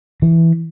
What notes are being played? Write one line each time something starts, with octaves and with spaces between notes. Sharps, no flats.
E3